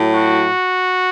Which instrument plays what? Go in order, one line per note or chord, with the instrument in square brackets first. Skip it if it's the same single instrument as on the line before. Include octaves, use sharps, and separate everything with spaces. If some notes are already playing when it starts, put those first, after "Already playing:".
Already playing: [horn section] A2 F#3
F#4